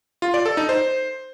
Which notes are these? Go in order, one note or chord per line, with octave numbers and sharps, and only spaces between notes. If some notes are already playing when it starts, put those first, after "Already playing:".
F4
D5
A4
D#4
C5